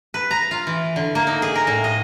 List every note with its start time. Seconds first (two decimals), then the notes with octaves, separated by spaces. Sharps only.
0.14 B4
0.31 A#5
0.51 F4
0.67 E3
0.96 D3
1.15 A#3
1.27 D#4
1.42 G#4
1.55 A#4
1.67 A2
1.84 D#5